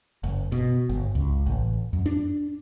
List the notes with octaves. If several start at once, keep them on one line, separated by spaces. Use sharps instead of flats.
F#1
B2
G1
C#2
A1
F#2
D4